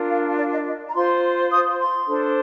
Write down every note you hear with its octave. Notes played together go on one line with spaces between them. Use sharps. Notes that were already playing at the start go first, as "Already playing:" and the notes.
Already playing: D4 F4 A#4
F5
D5
D#5
D#5
A#5
F4 C5 C6
D#6
C6
D4 A4 C5